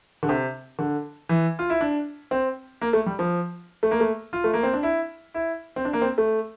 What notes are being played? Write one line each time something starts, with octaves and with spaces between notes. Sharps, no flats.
D3
C3
D3
E3
F4
E4
D4
C4
A#3
A3
G3
F3
A3
A#3
A3
F4
A3
A#3
C4
D4
E4
E4
C4
D4
A#3
C4
A3